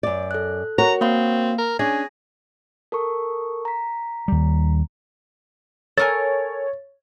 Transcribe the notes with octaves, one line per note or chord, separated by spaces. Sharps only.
F#2 D5
A4 F#6
F#4 A#4 C#5 A#5
A#3 C4 F5 C6
A#4
C#4 D4 G#4 A#6
A4 A#4 C#6
A#5 B6
D#2 G3
A4 A#4 C#5 G#5 A6